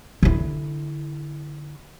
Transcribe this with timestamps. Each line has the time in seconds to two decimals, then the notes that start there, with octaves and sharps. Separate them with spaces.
0.23 D3 E4